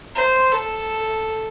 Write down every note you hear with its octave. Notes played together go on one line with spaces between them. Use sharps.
C5
A4